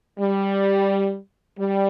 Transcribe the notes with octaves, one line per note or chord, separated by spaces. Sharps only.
G3
G3